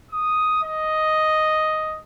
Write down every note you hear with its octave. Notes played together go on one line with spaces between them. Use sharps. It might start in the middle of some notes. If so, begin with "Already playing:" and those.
D#6
D#5